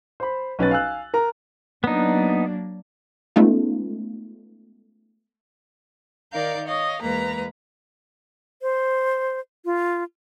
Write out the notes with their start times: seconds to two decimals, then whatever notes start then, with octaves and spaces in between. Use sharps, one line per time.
0.20 C5 B5
0.59 B1 C#4 B4 A6
0.71 F5 G#5 E6 F#6
1.14 A#4 A#5
1.84 F#3 A#3 B3 D4 D#4
3.36 G#3 A3 B3 C#4 D#4 F4
6.33 D#3 D#4 A#4 D5 F5 G6
6.66 C#5 D#5 F5
7.02 E2 G#3 A#3 B4 A#5
8.62 C5
9.65 F4